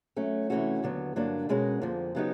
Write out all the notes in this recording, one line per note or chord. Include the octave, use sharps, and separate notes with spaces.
F#3 A3 C#4
C3 E3 A3 C#4 F#4
D#2 D3 F#3 B3
G2 D3 F#3 A#3 D4
B2 G#3 C#4 F#4 A#4
F2 D3 F3 A#3
C#3 F#3 B3 D#4 G4